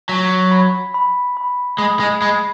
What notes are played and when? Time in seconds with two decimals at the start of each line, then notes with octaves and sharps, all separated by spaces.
0.09 F#3 B6
0.52 B5
0.94 B5
1.37 B5
1.78 G#3 B5
2.00 G#3
2.21 G#3 B5